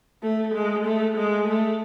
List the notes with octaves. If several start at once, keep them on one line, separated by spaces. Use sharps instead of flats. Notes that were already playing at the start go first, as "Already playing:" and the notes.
A3
G#3
A3
G#3
A3